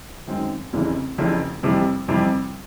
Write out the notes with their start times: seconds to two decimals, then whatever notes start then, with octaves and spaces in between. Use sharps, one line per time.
0.28 F#2 D#3 G#3 C4
0.73 F1 F2 C#3 E3
1.18 F1 F2 C#3 E3
1.63 F2 C3 E3 G3
2.08 F2 C3 E3 G3